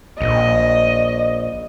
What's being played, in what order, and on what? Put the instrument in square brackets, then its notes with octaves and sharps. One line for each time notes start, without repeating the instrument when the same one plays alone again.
[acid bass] A#1 [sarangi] D#5